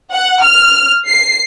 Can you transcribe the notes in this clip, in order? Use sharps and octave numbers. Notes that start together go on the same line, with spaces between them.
F#5
F6
C7